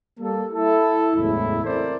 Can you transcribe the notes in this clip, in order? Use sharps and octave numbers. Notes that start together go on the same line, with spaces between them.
G3 A#3 A4
E4 A4
F#1 E2 A2 G#3 E4
C4 E4 A4 A#4 C5 D5